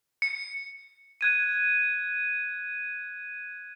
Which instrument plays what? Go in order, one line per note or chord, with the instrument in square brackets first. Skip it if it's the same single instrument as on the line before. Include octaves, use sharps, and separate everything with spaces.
[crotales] C#7
F#6 G#6 D#7